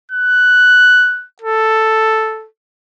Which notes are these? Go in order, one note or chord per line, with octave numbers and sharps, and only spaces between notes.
F#6
A4